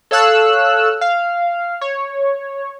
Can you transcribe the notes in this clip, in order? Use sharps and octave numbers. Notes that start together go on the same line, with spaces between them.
A4 C#5 F5 E6 F#6
F5
C#5